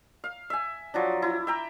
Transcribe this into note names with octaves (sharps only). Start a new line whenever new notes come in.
F5
E5 G#5
F3 F#3 D4
E4
E5 G5 A#5